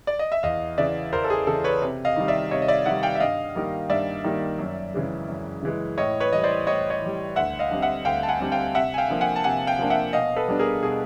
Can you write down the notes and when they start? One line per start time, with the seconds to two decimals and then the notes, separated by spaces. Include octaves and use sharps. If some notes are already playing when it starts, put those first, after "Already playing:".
0.07 D5
0.19 D#5
0.32 E5
0.43 E2 D#5 F5
0.78 C#3 E3 D5 E5
1.13 E2 A#4 C5
1.24 A4
1.30 G#4
1.47 C#3 E3 A4
1.64 B4 C#5
1.82 C3
2.05 D#5 F5
2.16 D#3 G3
2.28 D5 E5
2.51 C3 C#5 D#5
2.62 D#5
2.68 D5 E5
2.85 D#3 G3 E5 F#5
3.03 F5 G5
3.15 E5
3.20 G2 D#5 F5
3.55 D#3 G3 A#3
3.90 G2 D5 E5
4.24 D#3 G3 A#3
4.59 F#2
4.94 C#3 E3 G#3
5.28 F#2
5.63 C#3 E3 G#3
5.98 A2 C#5 D#5
6.20 B4 C#5
6.32 E3 G3 D#5
6.44 C5 D5
6.67 A2 C#5 D#5
6.90 C#5 D#5
7.01 E3 G3
7.36 D2 E5 F#5
7.59 D#5 F5
7.71 D3 G3 C4
7.82 E5 F#5
8.05 D2 F5 G5
8.23 A5
8.28 F#5 G#5
8.40 D3 G3 C4
8.52 F5 G5
8.75 C3 E5 F#5
8.94 G#5
8.98 F5 G5
9.09 F3 A#3 D4
9.21 F#5 G#5
9.36 A5
9.44 C3 F#5 G#5
9.67 F5 G5
9.79 F3 A#3 D4
9.90 E5 F#5
10.13 B2 D#5 F5
10.36 A4 B4
10.48 G3 B3 D4
10.59 G#4 A#4
10.82 B2 G#4